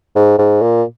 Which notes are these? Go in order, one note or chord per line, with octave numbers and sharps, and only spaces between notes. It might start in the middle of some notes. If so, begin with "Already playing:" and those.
G#2
G#2
A#2